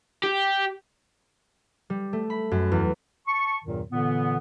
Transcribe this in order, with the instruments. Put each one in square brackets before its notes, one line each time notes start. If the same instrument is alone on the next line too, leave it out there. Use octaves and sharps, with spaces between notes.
[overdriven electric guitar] G4
[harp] G3
A3
B5
F#2
E2
[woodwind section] A5 C#6
E2 G2 A#2 D#3 F#3
A#2 D3 E3 B3